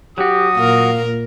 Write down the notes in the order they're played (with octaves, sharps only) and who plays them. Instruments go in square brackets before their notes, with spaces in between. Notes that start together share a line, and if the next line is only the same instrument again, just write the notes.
[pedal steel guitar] F#3 F#4 [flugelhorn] G4 [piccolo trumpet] D#6
[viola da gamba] A#2 A#4 [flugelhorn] F5